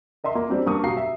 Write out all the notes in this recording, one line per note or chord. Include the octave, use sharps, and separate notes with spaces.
A#4 D#5 E5 C6
A#3
G3 C4 D4
G2 A#3 C#6 D#6
B2 G4 F5 A#5 C7
E5